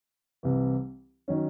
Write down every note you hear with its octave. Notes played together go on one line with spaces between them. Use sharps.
C2 C3 E3
D#3 F#3 C#4